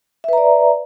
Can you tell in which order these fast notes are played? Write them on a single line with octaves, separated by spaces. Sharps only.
E5 B4 A#5 D5